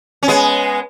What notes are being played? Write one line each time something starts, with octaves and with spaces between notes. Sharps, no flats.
C#4
G#3 B3